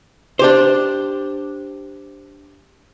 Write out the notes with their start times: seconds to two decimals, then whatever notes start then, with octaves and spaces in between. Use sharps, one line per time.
0.39 D4 G4 C5